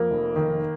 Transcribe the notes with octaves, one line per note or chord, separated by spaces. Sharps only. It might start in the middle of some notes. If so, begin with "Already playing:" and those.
Already playing: F2 A#3
F1
D#3